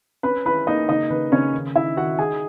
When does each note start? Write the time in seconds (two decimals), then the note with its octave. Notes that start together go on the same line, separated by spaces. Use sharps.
0.23 C#4 B4 B5
0.45 E4 B4 B5
0.67 A#3 D#4 D#5
0.89 C#3 D#4 D#5
1.10 C#3 B4
1.32 C#3 C#4 C#5
1.53 D#3
1.76 D#4 E4 E5
1.97 D#3 F#4 F#5
2.19 D#4 G#4 G#5